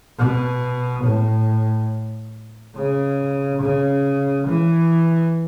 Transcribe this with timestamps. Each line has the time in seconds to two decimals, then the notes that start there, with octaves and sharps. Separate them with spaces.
0.18 B2
1.03 A2
2.75 C#3
3.61 C#3
4.47 E3